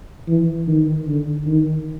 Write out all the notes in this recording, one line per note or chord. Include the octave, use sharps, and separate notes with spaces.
E3
D#3
D3
D#3